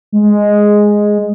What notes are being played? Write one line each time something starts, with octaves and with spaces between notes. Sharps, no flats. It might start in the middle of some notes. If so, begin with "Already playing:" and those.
G#3